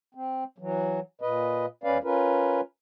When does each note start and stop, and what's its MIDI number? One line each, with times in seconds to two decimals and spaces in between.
0.15 0.44 60
0.58 1.00 52
0.58 1.00 54
1.21 1.66 46
1.21 1.66 71
1.21 1.66 75
1.84 1.98 40
1.84 1.98 61
1.84 1.98 71
1.84 1.98 74
1.84 1.98 77
2.03 2.61 61
2.03 2.61 65
2.03 2.61 70
2.03 2.61 71